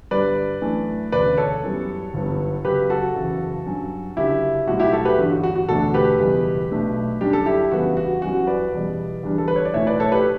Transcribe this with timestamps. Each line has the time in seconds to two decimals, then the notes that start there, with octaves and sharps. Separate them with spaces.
0.11 G2 D3 G3 B4 D5
0.61 F#2 E3 A3 D4
1.12 E1 D2 C#3 B4 D5
1.37 A4 C#5
1.63 F#2 E3 G3 B3
2.14 G1 F#2 E3 G3 B3
2.64 F#1 F#2 C#3 F#3 G4 B4
2.90 F#4 A4
3.15 F#1 E2 C#3
3.66 G2 F#3 C#4
4.17 F#1 F#2 D3 F#3 E4 G4
4.67 B1 A2 G3 F#4
4.80 E4 G4
4.93 F#4 A4
5.05 G4 B4
5.18 A1 G2 D3 G3 D4 F#4
5.31 F#4
5.44 F#4
5.56 F#4
5.69 E1 D2 D3 A3 D4 F#4 A4
5.94 G4 B4
6.19 F#1 E2 B2 G3 B3
6.70 B1 B2 A3 D4
7.21 F#2 D3 G3 D4 G4
7.33 A4
7.46 E4 G4
7.72 E2 C#3 G3 B3 D4 F#4
7.97 F#4
8.22 F#2 E3 G3 C#4 F#4
8.47 B4 D5
8.72 E2 B2 G3
9.23 E2 D3 G3 D4
9.38 A4
9.48 B4
9.56 C#5
9.65 D5
9.74 B1 A2 E3 A3 C#5 E5
9.87 B4 D5
10.00 A4 C#5
10.12 G4 B4